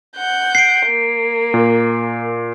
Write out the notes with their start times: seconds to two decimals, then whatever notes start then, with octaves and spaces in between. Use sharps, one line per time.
0.17 F#5 G6
0.55 C7 D7
0.86 A#3
1.54 A#2